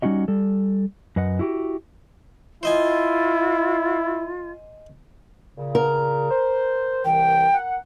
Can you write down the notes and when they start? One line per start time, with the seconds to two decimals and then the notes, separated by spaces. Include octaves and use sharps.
0.02 G3 C#4 D#4 F#4 D#5
0.28 G3 A4
1.16 F#2 B4 D#5 F#5
1.39 E4 F#4 G4
2.63 E4 F4 C5 D#5 G#5
5.56 A#2 C#3
5.75 A#4
6.30 C5
7.05 C2 E3 G5
7.53 F#5